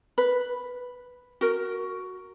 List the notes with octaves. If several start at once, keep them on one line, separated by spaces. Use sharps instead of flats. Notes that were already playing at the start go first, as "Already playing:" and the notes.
B4
F#4 A#4